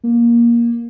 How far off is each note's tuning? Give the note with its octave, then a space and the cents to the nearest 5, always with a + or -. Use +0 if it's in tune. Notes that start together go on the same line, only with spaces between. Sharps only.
A#3 +15